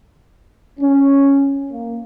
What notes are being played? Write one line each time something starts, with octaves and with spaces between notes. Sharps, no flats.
C#4
A#3